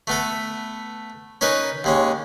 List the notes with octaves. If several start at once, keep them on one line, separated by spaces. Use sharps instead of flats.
A3 B3 A4
C#4 D#4 A#4 B4
D#2 G#3 C#4